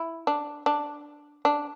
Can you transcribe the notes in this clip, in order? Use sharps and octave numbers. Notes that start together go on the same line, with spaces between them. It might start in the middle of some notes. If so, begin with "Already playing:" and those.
Already playing: E4
D4
D4
D4